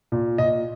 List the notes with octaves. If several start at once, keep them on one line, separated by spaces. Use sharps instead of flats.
A#2
A#2 D#5